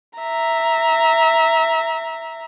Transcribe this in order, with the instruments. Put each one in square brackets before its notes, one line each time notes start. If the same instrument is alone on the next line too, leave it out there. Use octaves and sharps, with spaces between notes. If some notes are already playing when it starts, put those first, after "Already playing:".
[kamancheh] E5 A#5